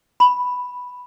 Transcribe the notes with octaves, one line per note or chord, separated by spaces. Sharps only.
B5